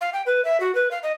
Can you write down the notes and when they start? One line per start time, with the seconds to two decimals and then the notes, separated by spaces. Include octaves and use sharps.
0.01 F5
0.13 G5
0.26 B4
0.45 E5
0.60 F#4
0.75 B4
0.91 F5
1.03 D#5